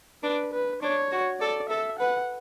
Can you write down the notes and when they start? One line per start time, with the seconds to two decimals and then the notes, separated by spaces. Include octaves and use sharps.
0.23 D4 B4
0.53 B4
0.82 D4 C#5
1.12 F#4
1.40 A4 D5
1.69 A4 E5
1.99 B4 F#5